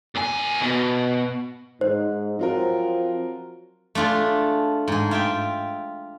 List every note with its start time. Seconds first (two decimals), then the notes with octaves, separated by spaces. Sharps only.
0.16 D#2 G#5
0.62 B2
1.81 G#2 D#4 C5
2.39 F3 F#3 C4 F4 A#4
3.95 A3 D4 F4 G#4
4.88 G#2 G#4
5.11 F4 E5 G5